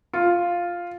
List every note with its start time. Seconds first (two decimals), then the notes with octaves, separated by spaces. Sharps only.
0.13 F4